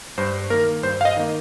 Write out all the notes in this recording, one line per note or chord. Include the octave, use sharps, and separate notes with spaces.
G2 C5
D#3 A#3 A#4
G2 C5
F5
D#5
D#3 A#3